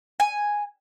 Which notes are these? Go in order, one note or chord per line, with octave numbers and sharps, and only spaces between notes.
G#5